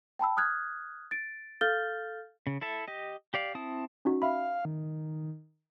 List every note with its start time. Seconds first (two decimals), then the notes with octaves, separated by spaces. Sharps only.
0.19 G5 A5 B5 E6
0.37 D#6 F6 F#6 G#6
1.11 A6 D7
1.61 A4 F5 F6 G6 A6 G7
2.47 C#3
2.61 E4 A4 E5
2.88 G4 D#5
3.34 G4 D5 F5
3.55 C4 E4 A5 D#6
4.05 C#4 D#4 F#4
4.22 E5 F5 B5
4.65 D#3